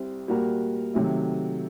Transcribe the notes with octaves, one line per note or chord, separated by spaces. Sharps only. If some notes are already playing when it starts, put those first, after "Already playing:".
Already playing: C2 C3 G3 C4
A#2 G3 A#3 F#4 A#4
C3 D#3 F#3 A3